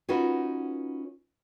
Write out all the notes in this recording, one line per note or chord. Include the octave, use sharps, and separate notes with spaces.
C#4 D#4 F4 F#4 A#4 B4